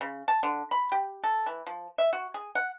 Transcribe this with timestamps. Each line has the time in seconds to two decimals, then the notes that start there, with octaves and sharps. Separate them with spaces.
0.01 C#3
0.28 A5
0.43 D3
0.71 B5
0.92 G4
1.24 A4
1.46 E3
1.67 F3
1.98 E5
2.13 F#4
2.34 G#4
2.55 F#5